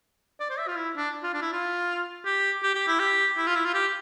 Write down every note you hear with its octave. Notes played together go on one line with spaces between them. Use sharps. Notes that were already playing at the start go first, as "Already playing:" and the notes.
D5
C5
E5
F4
E4
D4
F4
D4
E4
F4
G4
G4
G4
E4
G4
E4
F4
E4
F4
G4